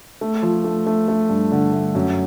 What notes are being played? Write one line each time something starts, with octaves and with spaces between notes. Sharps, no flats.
A3
F3
A3
A3
A3
G2
D3
A3
F#2